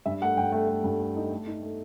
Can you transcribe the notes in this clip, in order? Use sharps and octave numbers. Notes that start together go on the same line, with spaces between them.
G2 E5
A3 F#5
G2 G5
A3 F#5
A3
G2
A3
D#4
A3
D#4
A3